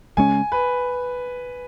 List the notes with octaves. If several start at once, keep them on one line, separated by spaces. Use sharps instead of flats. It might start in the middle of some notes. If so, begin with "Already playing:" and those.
C#3 G#3 C#4 G#5
B4